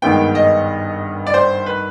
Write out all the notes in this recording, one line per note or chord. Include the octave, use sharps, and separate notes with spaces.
G#1 G2 D#3 G#3 B3 G5
D#5
D5
C5
B4